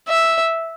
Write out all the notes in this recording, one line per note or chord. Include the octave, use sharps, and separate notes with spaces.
E5